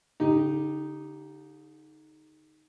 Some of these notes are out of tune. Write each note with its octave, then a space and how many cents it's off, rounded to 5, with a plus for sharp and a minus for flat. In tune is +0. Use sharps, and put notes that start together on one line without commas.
D3 -35 D#4 +0 G4 +0